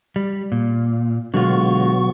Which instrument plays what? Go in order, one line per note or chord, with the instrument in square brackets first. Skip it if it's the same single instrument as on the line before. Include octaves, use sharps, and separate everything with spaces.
[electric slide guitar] G3
A#2
[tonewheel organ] B2 F#3 C#6 [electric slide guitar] D3 G#3 F4